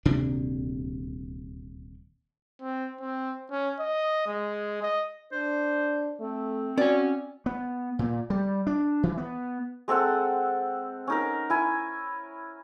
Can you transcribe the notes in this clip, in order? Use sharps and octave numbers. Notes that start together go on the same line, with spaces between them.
D#1 D2 C3 D4
C4
C4
C#4
D#5
G#3
D#5
D4 C5
A3 C4
C#4 F#4 D5 G#5
B3
A#2
G3
D4
E3
B3
G#3 C4 A4 F#5
C#4 D#4 A#4
E4 G#5